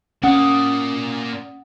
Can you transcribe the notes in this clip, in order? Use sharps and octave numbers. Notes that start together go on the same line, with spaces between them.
A#3 C#4 D5 F#5 D#6